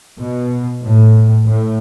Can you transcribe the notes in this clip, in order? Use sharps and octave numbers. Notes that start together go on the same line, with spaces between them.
B2
A2
A2